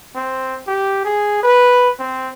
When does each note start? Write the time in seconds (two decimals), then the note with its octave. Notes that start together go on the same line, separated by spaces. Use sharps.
0.15 C4
0.68 G4
1.05 G#4
1.43 B4
1.99 C4